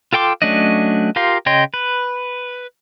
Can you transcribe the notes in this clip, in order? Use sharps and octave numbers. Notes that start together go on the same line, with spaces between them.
F4 A4 G5 C6 D6
F#3 A3 C#4 D4 D#5
F4 G4 A#4 F5 C6
C#3 C#5 D#5 G5 C6
B4